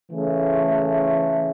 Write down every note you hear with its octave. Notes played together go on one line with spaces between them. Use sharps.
C#3 E3 A3